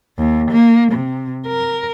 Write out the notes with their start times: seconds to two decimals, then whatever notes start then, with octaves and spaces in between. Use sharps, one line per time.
0.19 D#2
0.51 A#3
0.92 C3
1.47 A#4